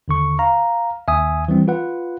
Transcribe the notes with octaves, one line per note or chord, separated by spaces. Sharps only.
D#2 D3 C#6
F5 A#5
D#2 E5 G#5 D#6
E3 G3 C4
F4 B4 F#5